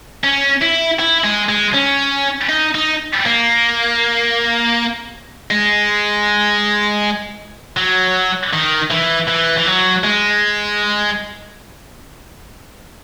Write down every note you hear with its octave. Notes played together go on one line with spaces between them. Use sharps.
C#4
E4
E4
G#3
G#3
C#4
D#4
D#4
A#3
G#3
F#3
D#3
E3
E3
E3
F#3
G#3